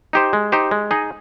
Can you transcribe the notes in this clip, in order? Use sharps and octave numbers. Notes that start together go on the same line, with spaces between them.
D#4 G4 C5
G#3
D#4 G4 C5
G#3
D#4 G#4 D#5